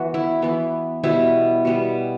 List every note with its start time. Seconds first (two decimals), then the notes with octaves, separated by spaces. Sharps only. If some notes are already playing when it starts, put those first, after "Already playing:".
Already playing: E3 B3 F#4
0.14 E4
0.42 E3 B3 E4
1.04 B2 G3 B3 E4
1.65 B2 G3 B3